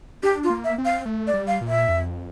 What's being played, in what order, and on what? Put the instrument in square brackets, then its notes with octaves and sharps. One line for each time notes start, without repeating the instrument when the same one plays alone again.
[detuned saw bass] D4 [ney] G4
[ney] F4
[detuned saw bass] A#3
[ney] E5
[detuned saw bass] C4
[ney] F5
[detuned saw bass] A3
[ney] D5
[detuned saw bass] G3
[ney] F5
[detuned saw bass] A#2
[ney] E5
[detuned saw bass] F2